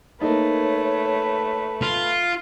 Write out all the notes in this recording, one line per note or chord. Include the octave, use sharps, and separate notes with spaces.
A3 A#3 D#4 B4 C#5
F4